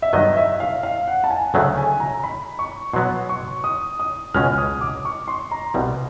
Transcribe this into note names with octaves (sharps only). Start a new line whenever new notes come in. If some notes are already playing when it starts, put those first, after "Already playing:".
E5
G2 D#3 F#3 B3 D#5
E5
F5
F5
F#5
A5
G#5
D2 C#3 F#3 A3 G5
G#5
A#5
B5
C#6
B2 F#3 B3 C6
C#6
D#6
D#6
C#2 B2 G#3 C#4 F6
D#6
D6
C#6
C6
A#5
C2 B2 G3